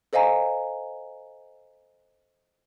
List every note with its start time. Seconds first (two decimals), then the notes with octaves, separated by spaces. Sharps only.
0.13 A4 C5 D#5 F5 G#5 A#5